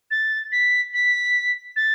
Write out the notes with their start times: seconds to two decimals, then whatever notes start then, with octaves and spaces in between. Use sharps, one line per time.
0.10 A6
0.52 B6
0.94 B6
1.76 A6